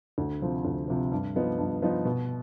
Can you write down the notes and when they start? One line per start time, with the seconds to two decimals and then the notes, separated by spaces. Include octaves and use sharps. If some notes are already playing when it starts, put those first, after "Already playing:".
0.18 D2
0.42 C3 F3 C4
0.65 D2
0.88 C3 F3 C4
1.12 G2
1.36 F3 B3 D#4
1.58 G2
1.82 F3 B3 D#4
2.05 B2